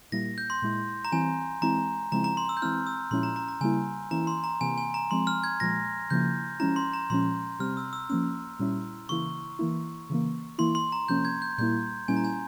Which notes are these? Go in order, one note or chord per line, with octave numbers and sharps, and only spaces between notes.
A#2 G3 A#3 E4 A#6
G6
C6
A#2 G#3 E4
A#5
E3 G3 C4 E4 G#5
E3 G#3 C4 E4 A#5
C#3 F3 G#3 C4 E4 A#5
A#5
C6
E6
G6
E3 G#3 C4 E4 F6
E6
A#2 F3 G#3 C#4 E4 C6
A#5
A#5
A#5
C#3 G3 A#3 E4 G#5
E3 A#3 C#4 E4 A#5
C6
A#5
C3 E3 A#3 G#5
G#5
A#5
F3 G#3 C4 C6
F6
G#6
A#2 F3 G#3 A#6
C#3 F3 A#3 E4 G6
F3 G#3 C#4 E4 A#5
C6
A#5
A#2 F3 G#3 C#4 C6
C3 G3 C4 F6
E6
E6
F3 A#3 C#4 E6
A#2 G3 C#4 E4
C#3 E3 A#3 E4 C#6
E3 A#3 E4
C#3 E3 A#3
E3 A#3 E4 C6
C6
A#5
C3 F3 A#3 C#4 G6
G#6
G6
A#2 G3 A#3 E4 G6
A#2 G3 A#3 C#4 E4 G#5
A#5
G#5